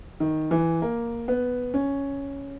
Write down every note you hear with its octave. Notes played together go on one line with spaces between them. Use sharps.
D#3
E3
A#3
B3
C#4